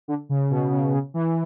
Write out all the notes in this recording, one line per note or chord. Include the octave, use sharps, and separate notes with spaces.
D3
C#3
B2
C#3
C#3
E3